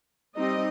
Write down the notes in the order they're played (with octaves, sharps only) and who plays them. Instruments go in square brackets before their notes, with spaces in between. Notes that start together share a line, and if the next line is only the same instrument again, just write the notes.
[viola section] G3 C4 D#4 D#5